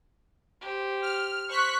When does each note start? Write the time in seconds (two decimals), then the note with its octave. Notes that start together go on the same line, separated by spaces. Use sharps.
0.61 G4 C5
1.02 F6
1.49 C5 C#6 F#6 B6